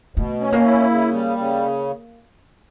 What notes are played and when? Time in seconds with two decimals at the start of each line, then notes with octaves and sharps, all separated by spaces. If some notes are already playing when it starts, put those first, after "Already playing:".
0.16 B2 A3
0.41 C#4
0.52 A#3
0.64 E4
0.89 C#3
1.13 G3
1.38 C#3